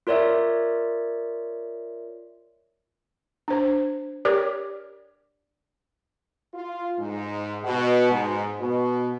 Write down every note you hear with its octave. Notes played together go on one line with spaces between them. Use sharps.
F4 A#4 C#5 D5 E5
D4 C5
G4 A#4 C#5 D5
F4
G#2
B2
G#2
B2